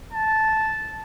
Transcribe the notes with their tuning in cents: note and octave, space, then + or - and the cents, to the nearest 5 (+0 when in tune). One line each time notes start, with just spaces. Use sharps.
A5 -10